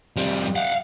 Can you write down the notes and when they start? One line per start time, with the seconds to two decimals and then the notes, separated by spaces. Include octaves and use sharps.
0.16 F2 G3
0.55 F5 F#5